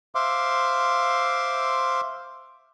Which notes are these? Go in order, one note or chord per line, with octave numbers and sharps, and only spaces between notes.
C5 E5 F5 C6 D6